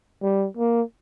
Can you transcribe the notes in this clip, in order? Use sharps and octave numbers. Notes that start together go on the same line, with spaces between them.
G3
A#3